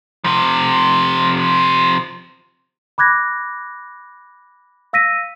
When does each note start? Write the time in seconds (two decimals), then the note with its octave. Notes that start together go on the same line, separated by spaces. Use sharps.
0.24 C3 F3
2.98 B5 D6 F#6 G#6 A#6
4.93 F5 E6 A#6 B6 D#7